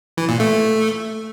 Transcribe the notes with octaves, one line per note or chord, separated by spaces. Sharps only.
E3
A#2
A3